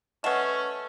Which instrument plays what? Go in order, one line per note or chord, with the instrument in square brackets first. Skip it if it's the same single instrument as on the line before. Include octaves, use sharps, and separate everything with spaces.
[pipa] A3 [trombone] C#4 [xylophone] B4 E7 [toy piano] D#5 F#5 D#6